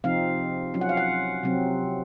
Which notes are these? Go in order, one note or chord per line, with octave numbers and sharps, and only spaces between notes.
C3 F3 C4 D#4 F5
F#3 C#4 F4
F#5
F5
F#5
C3 F#3 C4